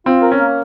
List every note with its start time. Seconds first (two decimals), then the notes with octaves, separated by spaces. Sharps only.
0.06 C4 F4
0.22 A#4
0.31 C#4
0.40 A#3